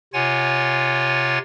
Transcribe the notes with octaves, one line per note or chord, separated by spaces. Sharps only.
C3 F4 C#5 F#5 G#5 A6